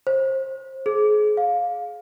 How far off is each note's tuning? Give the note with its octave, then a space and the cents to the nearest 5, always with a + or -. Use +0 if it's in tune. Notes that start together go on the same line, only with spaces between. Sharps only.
C5 +30
G#4 +30
F5 +20